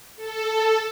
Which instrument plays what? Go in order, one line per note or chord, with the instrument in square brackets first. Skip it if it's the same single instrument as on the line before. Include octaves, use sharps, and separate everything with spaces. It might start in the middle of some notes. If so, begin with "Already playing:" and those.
[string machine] A4